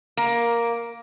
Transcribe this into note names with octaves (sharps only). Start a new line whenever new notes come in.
A#3